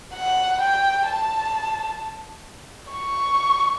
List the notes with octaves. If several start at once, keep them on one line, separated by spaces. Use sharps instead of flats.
F#5
G5
A5
C#6